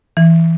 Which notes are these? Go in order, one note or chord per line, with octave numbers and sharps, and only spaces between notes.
E3